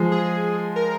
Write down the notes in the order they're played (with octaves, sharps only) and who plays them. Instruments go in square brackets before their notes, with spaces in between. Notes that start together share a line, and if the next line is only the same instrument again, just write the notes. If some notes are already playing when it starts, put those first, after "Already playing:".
Already playing: [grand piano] F3 G#3
[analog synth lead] G#4
A#4